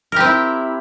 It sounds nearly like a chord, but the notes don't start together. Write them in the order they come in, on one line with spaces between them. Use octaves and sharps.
A#4 G4 C4 E4